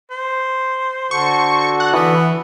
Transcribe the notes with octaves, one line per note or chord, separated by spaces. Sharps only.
C5
D3 F#4 A4 C#6
F#5
E3 B3